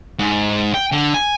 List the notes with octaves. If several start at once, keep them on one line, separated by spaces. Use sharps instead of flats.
G#2
G5
D3
G#5